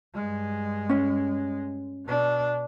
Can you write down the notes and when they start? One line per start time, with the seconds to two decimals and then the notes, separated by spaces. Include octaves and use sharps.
0.15 G2 G#3
0.90 C#4
2.06 B2 D4